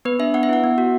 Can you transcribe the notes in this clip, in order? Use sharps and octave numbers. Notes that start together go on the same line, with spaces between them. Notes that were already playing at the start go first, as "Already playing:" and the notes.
B3 B4
D4 E5
B3 F#5
E5
E4 F#5
B3
F#4